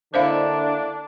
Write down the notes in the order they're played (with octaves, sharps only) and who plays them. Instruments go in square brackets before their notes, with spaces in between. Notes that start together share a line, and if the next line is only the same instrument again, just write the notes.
[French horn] D3 [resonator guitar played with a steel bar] A#3 E4 [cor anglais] D4 [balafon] C5 D#5 F5